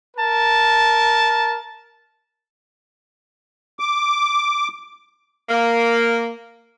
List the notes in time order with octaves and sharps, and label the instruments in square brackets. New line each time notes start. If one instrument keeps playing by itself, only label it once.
[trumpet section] A#4 A5
[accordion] D6
[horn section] A#3